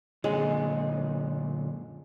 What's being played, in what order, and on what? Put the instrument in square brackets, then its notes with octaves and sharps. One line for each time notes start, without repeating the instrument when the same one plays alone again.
[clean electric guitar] F#2 A#2 D3 [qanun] G#3